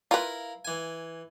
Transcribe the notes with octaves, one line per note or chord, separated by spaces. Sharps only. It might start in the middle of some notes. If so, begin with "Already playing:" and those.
E4 F4 A#4 B4 F5
E3 G#5